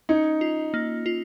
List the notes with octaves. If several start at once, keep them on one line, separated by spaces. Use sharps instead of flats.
C#4 D#4
F4
A#3
F4